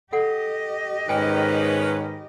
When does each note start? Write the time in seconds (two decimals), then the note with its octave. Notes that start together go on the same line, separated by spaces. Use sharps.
0.13 G4 A4 D#5 F#5
1.09 G#2 D#3 C#4 B4 G5 G#5